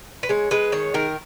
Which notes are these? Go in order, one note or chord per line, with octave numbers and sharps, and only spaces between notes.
B4
G#3 C#5
G#3 B4
D#3 C#5
D#3 A#4